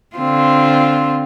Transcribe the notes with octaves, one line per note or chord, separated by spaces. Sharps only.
D3 C4 F4